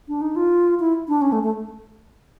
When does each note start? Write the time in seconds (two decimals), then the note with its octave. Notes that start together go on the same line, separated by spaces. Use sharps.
0.08 D4
0.21 D#4
0.36 F4
0.80 E4
1.08 D4
1.22 C#4
1.32 A3
1.43 A3